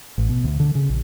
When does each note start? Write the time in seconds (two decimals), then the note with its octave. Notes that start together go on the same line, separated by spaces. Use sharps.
0.18 A1
0.29 B2
0.44 D2
0.60 D3
0.75 C#3
0.89 A#1